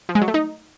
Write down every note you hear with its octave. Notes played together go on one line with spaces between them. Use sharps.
F3
G#3
F#3
A3
D#4